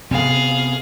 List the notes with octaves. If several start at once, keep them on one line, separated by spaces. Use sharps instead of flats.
C3 B3 G#4 F5